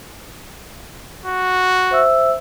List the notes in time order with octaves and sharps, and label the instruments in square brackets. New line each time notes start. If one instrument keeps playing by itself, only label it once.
[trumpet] F#4
[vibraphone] C5 E5 E6